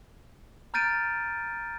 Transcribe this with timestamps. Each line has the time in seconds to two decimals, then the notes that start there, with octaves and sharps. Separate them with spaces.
0.74 A#5 F6 G6 A6 D7 D#7